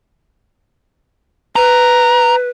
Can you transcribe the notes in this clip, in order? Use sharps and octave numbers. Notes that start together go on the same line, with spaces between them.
B4 A#5